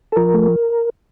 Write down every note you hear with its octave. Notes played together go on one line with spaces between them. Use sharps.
A4
F3 A#4
A3